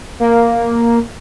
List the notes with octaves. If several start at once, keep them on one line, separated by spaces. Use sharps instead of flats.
A#3